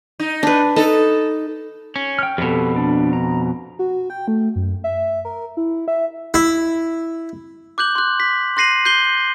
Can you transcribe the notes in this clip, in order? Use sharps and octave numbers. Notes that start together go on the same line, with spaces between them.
D#4
D4 B4
D#4 A4
C#4
G5 F6
F2 B2 G4 A4
D4
A#5
F#4
G5
A3
F#2
E5
A#4
E4
E5
E4
D6 F#6 G6 F#7
C6 F#6
B6
C6 F#6 A#6 C7 D#7 F#7
G6 C7 G7